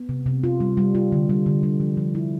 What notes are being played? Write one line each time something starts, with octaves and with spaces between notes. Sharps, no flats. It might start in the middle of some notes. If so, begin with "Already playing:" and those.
Already playing: B3
C3
C3
F4
G3
G3
F4
D3
G3
D3
G3
F3
F3
E4